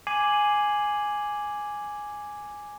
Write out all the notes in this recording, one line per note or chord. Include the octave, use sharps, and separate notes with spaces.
G#5 D6 G#6 C7 D#7 F#7